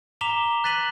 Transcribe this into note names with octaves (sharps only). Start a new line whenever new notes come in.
A#5 D6 B6 E7 F7 G7
F#6 A6 B6 D#7 F#7